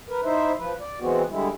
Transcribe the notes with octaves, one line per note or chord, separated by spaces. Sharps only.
A#4 B4
D#4 E4 C5 E5
F3 B4
D5
E3 G#3 B3 C4 F#4
D3 G3 G#3 E4